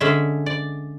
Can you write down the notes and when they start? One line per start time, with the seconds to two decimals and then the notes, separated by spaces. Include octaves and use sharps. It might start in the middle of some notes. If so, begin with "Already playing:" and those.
0.01 D3 G#3 C#4 E5
0.46 D5